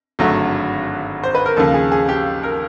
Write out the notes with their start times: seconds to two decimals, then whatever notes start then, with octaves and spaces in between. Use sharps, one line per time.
0.19 G#1 G2 D3 F#3 A3
1.23 C5
1.35 B4
1.46 A#4
1.56 D#2 C#3 F3 A#3 A4
1.74 G#4
1.92 G#4
2.09 G4
2.43 A#4